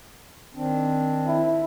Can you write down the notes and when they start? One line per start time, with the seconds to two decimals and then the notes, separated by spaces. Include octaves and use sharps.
0.55 D#3 C4 D4
1.27 E4